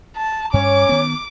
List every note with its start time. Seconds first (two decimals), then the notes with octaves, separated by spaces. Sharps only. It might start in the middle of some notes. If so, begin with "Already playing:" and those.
0.17 A5
0.54 G2 C#4 C#5 D6
0.89 D#3 B3